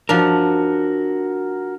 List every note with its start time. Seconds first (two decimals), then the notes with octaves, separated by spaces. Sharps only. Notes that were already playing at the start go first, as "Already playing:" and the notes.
0.09 F3 D4 F#4 A#4